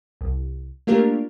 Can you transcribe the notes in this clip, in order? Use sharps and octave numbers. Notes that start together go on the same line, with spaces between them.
C2
A3 A#3 D4 F4 G4 A#4